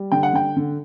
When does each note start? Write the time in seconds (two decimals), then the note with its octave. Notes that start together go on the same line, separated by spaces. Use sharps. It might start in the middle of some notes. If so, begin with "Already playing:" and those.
Already playing: G3
0.12 D3 G5
0.23 F#5
0.33 D3 G5
0.56 D3